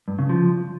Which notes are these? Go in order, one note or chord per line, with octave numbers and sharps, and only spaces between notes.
G2
C#3
F3